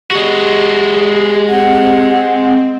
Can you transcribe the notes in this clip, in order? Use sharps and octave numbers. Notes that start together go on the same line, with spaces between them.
G#3 F#4 G4
C4 F#5